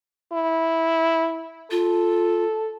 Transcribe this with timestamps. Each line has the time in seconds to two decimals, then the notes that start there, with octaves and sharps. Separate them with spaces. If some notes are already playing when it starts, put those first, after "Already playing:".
0.33 E4
1.71 F4 A4